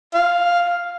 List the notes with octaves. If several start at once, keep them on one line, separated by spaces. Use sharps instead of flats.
F5